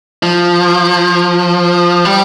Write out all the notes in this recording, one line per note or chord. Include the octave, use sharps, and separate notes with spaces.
F3
G3